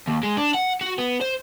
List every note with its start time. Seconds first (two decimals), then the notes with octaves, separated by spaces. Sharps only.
0.08 D#2
0.23 G#3
0.37 D4
0.54 F#5
0.81 F#4
0.98 B3
1.21 C5